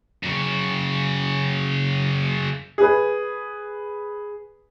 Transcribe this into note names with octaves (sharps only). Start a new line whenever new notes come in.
F#2 C#3
G#4 B4